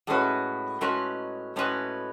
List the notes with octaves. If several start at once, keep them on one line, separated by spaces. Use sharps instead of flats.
A2 G#3 C#4 F#4 B4
A2 G#3 C#4 F#4 B4
A2 G#3 C#4 F#4 B4